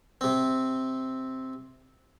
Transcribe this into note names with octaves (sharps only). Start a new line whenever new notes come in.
C3 C4